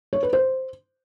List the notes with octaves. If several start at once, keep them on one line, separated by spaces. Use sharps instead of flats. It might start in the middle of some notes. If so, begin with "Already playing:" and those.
C#5
B4
C5